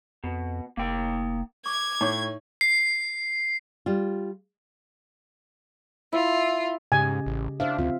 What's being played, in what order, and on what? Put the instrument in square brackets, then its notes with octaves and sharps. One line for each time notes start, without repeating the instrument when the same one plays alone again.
[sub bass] F2 [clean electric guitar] B2
[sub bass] F1 [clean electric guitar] A#3 G5
[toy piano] C#6 [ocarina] D6 [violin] G#6
[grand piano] A2 [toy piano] D#4 C#5 C#6
[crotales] C7
[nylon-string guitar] G3 F4
[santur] E4 [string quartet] F4
[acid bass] G#2 [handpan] C#3 G4 D#5 [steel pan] G#5
[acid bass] A1
[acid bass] D4 [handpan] C5 E5 F5
[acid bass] D2 [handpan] C4 F4